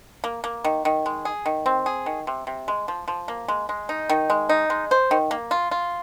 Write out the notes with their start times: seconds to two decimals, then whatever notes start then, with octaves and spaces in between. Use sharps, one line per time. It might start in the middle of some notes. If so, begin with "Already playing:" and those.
0.24 A#3
0.44 A#3
0.64 D#3
0.85 D#3
1.06 G#3
1.25 G#4
1.46 D#3
1.66 C4
1.86 G#4
2.06 D#3
2.27 C3
2.47 C3
2.68 G#3
2.88 F3
3.08 F3
3.28 A#3
3.48 G#3
3.69 G#3
3.89 D#4
4.09 D#3
4.30 G#3
4.49 D#4
4.70 G#3
4.91 C5
5.11 D#3
5.31 A#3
5.51 F4
5.71 F4